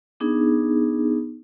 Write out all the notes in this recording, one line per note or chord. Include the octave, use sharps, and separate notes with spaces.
B3 D4 D#4 G#4